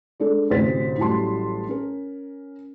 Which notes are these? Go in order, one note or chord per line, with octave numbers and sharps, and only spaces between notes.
G#3 D4 A4
A1 D2 C3 C5 A6 B6
A1 A2 F#3 G3 A5 C6
C#4 A#4